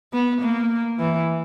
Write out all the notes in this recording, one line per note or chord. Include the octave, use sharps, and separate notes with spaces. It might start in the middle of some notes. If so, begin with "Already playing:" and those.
B3
A#3
E3